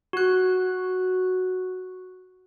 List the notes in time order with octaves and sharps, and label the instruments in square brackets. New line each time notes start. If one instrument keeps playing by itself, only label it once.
[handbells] F#4 F#6